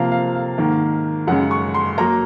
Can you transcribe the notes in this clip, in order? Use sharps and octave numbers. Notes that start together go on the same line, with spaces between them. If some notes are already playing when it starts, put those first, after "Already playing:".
Already playing: C3 F3 A#3 F5
F5
F5
G#2 D#3 A#3
F#2 C#3 G#3 F#5
C#6
C6
F#3 A#3 A#5